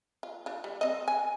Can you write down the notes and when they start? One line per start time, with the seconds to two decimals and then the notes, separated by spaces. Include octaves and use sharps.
0.23 F4
0.46 D4 F4
0.64 G3
0.81 C4 D#5
1.08 G#5